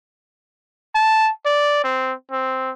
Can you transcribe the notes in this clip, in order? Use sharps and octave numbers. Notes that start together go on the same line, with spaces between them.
A5
D5
C4
C4